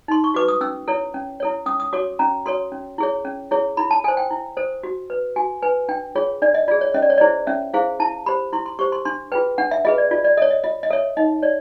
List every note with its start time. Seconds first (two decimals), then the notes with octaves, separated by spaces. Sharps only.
0.08 D#4 C6
0.24 C#6
0.34 F#4 B4 D6
0.48 D#6
0.61 C#4 E6
0.88 E4 A4 C#5
1.14 C#4
1.40 E4 A4 C#5
1.66 C#4 D#6
1.80 D#6
1.93 F#4 A4 C#5 D6
2.19 C#4 A#5
2.46 F#4 A4 C#5 C6
2.72 C#4
2.98 E4 G#4 C#5
3.25 C#4
3.51 E4 G#4 C#5
3.77 E4 B5
3.91 A5
4.04 A4 G#5
4.08 C5
4.17 G5
4.31 E4
4.57 A4 C5
4.83 F#4
5.10 B4
5.36 F#4 G#5
5.62 B4 G#5
5.89 D4 G5
6.15 F4 G#4 C#5
6.42 D4 D5
6.55 D#5
6.68 F4 D5
6.71 G#4
6.81 C#5
6.94 C#4 D#5
7.02 D5
7.10 C#5
7.18 E4 G#4 C5 D5
7.47 C#4 E5
7.74 E4 G#4 C5 F5
8.00 E4 A5
8.26 G4 C5 B5
8.53 E4 C6
8.66 C6
8.79 G4 C5 C#6
8.92 C6
9.05 D4 C6
9.32 F4 G#4 B4 G5
9.58 D4 F#5
9.71 E5
9.85 F4 G#4 B4 D#5
9.98 D5
10.11 F4 D5
10.24 D5
10.37 A4 C#5 D#5
10.51 D#5
10.64 F4 D#5
10.83 D#5
10.90 A4 C#5 E5
11.17 D#4 D#5
11.43 C#5 D5